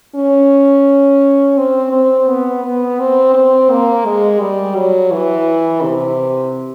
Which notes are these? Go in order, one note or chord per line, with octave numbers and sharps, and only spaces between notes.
C#4
C4
C4
B3
B3
C4
C4
A#3
G#3
G3
F#3
E3
C3